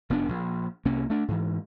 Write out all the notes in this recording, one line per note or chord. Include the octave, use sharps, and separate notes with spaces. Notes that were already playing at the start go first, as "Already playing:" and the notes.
F1 F#2 B3 D4
A#1
C2 C3 A#3 C#4
A3 D4
G#2 E3